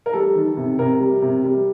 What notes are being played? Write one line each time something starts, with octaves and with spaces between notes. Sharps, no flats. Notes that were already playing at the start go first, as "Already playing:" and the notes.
A#4
G3 A4
D#3
C3
C3 A#4
G3
C3
G3